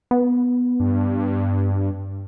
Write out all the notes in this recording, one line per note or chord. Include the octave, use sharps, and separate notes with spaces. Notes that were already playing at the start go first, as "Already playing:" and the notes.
B3
G2